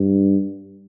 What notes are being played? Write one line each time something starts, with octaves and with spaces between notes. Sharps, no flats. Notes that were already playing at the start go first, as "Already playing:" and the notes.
Already playing: G2